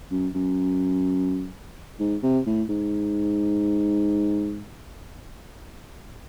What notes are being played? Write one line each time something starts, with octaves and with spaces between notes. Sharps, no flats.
F#2
F#2
G#2
C3
A2
G#2